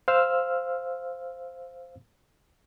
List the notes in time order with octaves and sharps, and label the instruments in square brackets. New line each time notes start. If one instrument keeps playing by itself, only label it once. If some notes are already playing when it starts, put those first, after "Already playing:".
[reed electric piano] C5 F5 E6 F6